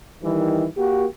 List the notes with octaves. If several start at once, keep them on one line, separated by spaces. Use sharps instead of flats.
D#3 E3 G3
A#3 F#4 G4